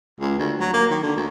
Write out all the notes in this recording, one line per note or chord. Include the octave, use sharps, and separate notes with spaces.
C#2
D2
F#3
A#3
D#3
D3
D2